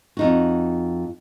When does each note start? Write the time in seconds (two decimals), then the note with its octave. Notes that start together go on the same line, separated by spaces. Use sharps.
0.17 F2 D#4 F#4